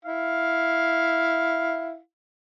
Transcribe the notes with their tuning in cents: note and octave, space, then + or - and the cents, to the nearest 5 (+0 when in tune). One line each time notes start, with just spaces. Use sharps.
E4 +0 F5 +0